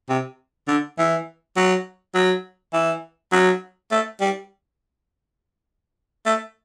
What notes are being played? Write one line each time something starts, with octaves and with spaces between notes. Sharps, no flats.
C3
D3
E3
F#3
F#3
E3
F#3
A3
G3
A3